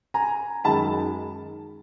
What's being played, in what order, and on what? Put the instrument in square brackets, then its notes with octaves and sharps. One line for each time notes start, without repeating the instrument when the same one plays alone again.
[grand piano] G#5 A#5
F#2 D#3 G#3 A5 B5